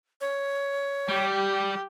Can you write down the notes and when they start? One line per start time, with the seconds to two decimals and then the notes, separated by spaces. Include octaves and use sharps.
0.21 C#5
1.09 G3 G4